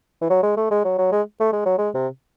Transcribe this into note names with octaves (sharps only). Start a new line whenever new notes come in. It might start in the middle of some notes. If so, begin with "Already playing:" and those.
E3
F#3
G#3
A3
G#3
F#3
F#3
G#3
A3
G#3
F#3
G#3
C3